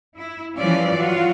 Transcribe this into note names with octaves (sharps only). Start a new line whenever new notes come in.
E4
E3 F3 G3 C#4 F4 D5
F#3 F4 F#4